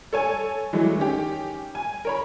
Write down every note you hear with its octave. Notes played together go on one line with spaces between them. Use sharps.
A4 C#5 G#5
E3 F#3 G#3 A3
D#3 C#4 G4
G#5
A#4 C#5 B5